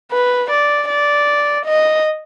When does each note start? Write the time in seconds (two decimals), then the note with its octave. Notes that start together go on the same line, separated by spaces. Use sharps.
0.12 B4
0.51 D5
0.89 D5
1.66 D#5